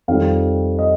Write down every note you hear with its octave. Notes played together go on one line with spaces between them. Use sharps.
F2 D#3 G3 F5
D#5